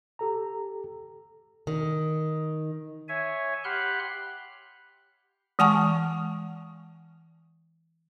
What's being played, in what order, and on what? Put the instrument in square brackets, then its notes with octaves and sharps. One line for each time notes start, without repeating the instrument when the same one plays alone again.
[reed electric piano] G4 A4 A#5
[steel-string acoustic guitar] D#3
[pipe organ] C#5 E5 G#5
G4 F#5 B5 C6 F6 F#6
[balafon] E3 G#3 F#5 G#5 A5 C#6